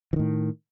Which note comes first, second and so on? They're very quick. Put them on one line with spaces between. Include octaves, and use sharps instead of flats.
E3 D#3 A2